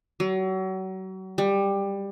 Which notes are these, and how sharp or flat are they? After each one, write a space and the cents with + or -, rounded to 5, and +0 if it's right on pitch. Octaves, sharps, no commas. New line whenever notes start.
F#3 +35
G3 +15